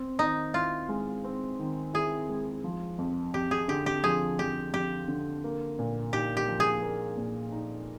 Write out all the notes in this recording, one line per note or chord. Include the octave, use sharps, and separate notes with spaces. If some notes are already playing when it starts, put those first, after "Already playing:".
Already playing: C4
D#3 D#4
E4 F4
G#3
C4
D#3
E4 G#4
G#3
F3
F2
F2 G4
G#4
D3 G4
G4
F3 G#4
F2 G4
F2 G4
D3
A#3
A#2
D#4 G4
G4
F3
G#4
A#3
A#2
D#4